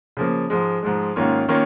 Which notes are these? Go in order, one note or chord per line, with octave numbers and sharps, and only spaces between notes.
C#3 F3 A#3
G#2 F3 G#3
G#2 F3 G#3
G#2 D#3 A#3 C#4 F4
D#3 A#3 C#4 F4